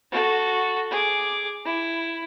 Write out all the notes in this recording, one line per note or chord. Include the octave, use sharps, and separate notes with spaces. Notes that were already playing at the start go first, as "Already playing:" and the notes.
F#4 A4
G#4 D6
E4